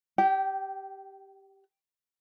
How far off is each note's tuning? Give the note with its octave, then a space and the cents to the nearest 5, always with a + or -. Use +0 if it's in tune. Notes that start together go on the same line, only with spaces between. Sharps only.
G4 +0 G5 -30